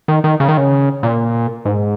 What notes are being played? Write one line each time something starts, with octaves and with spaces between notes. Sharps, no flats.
D#3
D#3
C#3
D#3
C#3
A#2
G#2